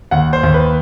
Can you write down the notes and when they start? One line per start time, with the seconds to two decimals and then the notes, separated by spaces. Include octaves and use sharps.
0.11 D#2 F#5
0.33 C5
0.43 D#2
0.54 B4